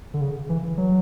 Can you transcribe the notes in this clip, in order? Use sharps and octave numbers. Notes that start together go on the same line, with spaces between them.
D3
C#3
E3
F#3